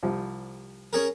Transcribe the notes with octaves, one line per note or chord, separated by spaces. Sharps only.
C2 F3 G3
C#4 G#4 A#4